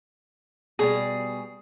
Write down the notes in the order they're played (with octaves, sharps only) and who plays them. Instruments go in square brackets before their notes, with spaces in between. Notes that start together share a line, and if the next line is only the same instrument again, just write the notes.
[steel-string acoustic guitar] B2 G3 [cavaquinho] G#4